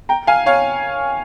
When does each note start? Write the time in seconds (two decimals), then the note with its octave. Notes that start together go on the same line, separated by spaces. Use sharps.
0.09 G5 A#5
0.27 F5 G#5
0.46 C#5 F5